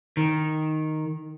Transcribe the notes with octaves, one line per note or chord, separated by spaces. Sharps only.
D#3